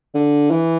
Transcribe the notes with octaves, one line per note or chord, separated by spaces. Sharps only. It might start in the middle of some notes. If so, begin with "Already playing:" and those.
D3
E3